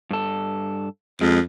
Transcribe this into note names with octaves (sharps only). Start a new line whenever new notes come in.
G2 A4
F2 G#3